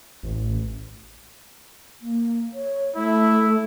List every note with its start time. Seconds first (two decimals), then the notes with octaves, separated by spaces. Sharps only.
0.23 A1
2.01 A#3
2.53 C#5
2.96 A3 E4